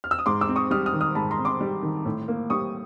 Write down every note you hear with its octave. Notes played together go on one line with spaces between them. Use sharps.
F6
E6
D#6
G#2 C6 D6
D6 E6
C4
C#6 D#6
G3 D#6 F6
D#6 F6
D#3
D#6 F6
G#2 A5 B5
A#5 C6
C4
C6 D6
G3
D#3
A2
A#3
G3 C#6 D#6